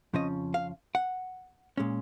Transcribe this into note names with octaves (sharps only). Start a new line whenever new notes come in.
F2 C#3 F3 C#4 D#5
F5
F#5
A#2 G#3 C#4